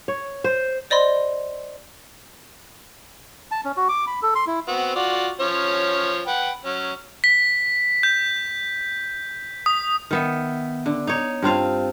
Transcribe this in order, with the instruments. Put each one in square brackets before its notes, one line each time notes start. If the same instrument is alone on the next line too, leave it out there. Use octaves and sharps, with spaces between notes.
[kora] C#5
C5
[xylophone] C5 D5 D#5 B5 C6
[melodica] A5
C#4
F#4
D6
B5
A4
C6
E4
[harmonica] B3 C4 F#4
F4 F#4 D5
F3 C#4 C#5
B4 F#5 G5
F#3 C#4
[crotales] B6
G6
D#6
[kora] D#3 B3 E5
D3
D#4 C#5
G2 C4 F4 F5